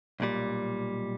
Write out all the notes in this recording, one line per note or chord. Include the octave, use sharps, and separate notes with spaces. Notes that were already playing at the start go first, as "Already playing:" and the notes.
B1 A#2 G3